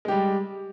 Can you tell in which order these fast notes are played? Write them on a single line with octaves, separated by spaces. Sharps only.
G#3 G4 G3